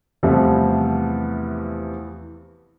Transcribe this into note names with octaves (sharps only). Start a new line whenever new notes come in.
E2 C3 E3 F3 G3 A3